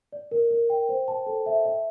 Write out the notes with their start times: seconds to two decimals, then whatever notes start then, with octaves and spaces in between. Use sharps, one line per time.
0.12 D5
0.31 A#4
0.51 A#4
0.70 G5
0.89 C5
1.08 A5
1.27 A4
1.46 E5
1.65 D#5